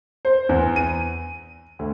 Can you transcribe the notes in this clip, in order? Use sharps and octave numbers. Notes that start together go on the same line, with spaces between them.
C5
E2
D#7
D2